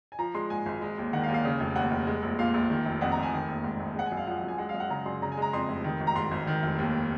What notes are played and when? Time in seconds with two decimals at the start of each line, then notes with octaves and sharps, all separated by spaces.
0.12 G#5
0.19 F3 A#5
0.35 G#3 C6
0.50 G#2 G#5
0.66 G#1
0.82 G#3
0.98 D#2
1.13 D#3 F#5
1.24 F5
1.28 D#2
1.34 F5
1.45 C#3
1.60 F1
1.76 D#2 F#5
1.91 F1
2.07 G#3
2.23 A#1
2.39 A#2 F5
2.54 A#1
2.70 D#3
2.85 F1
3.01 F2 F#5
3.12 A#5
3.17 F1
3.23 G#5
3.33 D#3
3.48 A#1
3.64 G#2
3.80 A#1
3.96 G#3 F#5
4.06 G#5
4.12 F#2
4.17 F5
4.27 F3 F#5
4.38 F#5
4.44 F#2 G#5
4.58 G#3 F#5
4.69 F5
4.74 F#2
4.80 F#5
4.90 C#3 A#5
5.06 F#2 C6
5.22 C#3 A#5
5.32 G#5
5.37 G#3
5.42 A#5
5.53 F2 C6
5.68 F1
5.84 D#3
6.00 G#1
6.07 A#5
6.15 G#2 C6
6.31 G#1
6.47 D#3
6.63 F1
6.79 D#2